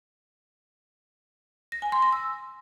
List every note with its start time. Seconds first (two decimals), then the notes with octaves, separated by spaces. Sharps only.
1.72 A#6
1.82 G#5
1.92 C6
2.02 A#6
2.13 E6